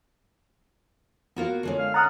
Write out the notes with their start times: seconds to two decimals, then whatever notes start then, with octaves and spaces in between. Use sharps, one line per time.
1.36 A#3 B3 F4 F#4 A#4 F5
1.63 D3 G#3 C#4
1.79 F5
1.94 F#5 A#5 D#6 F6 A6